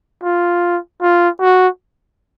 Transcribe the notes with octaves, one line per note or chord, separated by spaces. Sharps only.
F4
F4
F#4